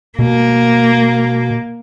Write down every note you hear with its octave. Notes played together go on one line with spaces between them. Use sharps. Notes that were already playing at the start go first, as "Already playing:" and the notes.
B2 A#3